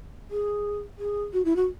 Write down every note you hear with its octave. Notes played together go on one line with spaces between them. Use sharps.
G#4
G#4
F#4
E4
F#4